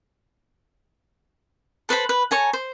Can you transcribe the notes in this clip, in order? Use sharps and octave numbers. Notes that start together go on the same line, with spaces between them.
A4 B4 C5 B5
B4
A4 C#5 G#5 A#5
C5